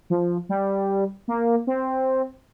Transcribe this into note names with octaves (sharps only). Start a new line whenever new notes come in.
F3
G3
A#3
C4